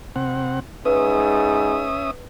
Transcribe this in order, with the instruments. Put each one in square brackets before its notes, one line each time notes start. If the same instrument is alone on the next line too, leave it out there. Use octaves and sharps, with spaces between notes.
[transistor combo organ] C3 C4 F#5
[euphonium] G#2 [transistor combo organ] C#4 E5 D#6 [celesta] B4